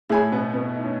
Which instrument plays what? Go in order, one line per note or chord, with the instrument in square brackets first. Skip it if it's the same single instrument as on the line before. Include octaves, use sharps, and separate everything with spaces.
[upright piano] A2 A3 [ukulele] G#4 C#5 G#5 B5
[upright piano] B2 B3
B2 B3
D#4
C#4